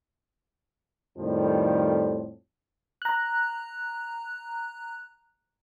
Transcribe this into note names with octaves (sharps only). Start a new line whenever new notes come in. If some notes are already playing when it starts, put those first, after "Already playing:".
F2 A2 D#3 F3 G3
A#5 F#6